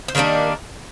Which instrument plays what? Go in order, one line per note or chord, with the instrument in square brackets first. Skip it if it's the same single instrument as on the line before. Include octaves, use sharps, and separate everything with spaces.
[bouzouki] C5
D#3 G3 A#3 D4 A#4